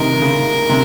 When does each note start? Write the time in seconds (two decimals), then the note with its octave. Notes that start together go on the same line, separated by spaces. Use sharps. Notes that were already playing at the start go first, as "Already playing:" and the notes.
Already playing: C3 D#3 A#4
0.22 C#3
0.69 C3